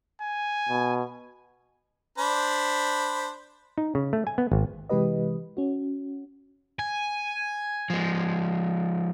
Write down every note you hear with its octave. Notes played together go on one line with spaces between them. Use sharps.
G#5
B2
D4 C5 B5
D#4
C#3
A3
G#5
B3
G#1
C3 E3 G#3 G4 B4 D#5
C#4 F#4
G#5
F3 G#3